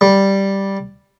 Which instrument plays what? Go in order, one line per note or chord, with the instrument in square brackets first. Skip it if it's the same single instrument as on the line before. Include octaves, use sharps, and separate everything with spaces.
[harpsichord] G3